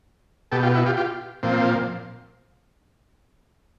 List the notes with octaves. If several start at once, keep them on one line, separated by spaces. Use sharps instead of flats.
B2 G4 A4
F4 G4
E4 F#4
F4 G4
F4 G4
A#2 F3 C4